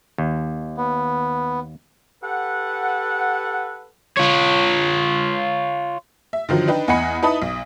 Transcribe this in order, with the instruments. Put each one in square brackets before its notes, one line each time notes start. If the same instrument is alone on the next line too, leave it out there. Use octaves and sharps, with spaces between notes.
[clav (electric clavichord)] D#2
[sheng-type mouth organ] B3
[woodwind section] G4 A4 B4 F#5
[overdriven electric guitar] F4 C#5
[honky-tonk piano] E5
D3 D#3 F3 F#3
D4 D#4 B4 G5
E2 D#5 F#5 G#5 B5 C#7
D#4 E4 B4 A5 B5 D#6
B1